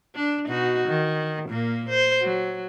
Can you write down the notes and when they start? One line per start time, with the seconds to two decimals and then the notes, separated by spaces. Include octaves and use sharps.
0.15 D4
0.47 B2 D#4 F#4
0.88 D#3
1.49 A#2 A#3
1.89 C5
2.22 F#3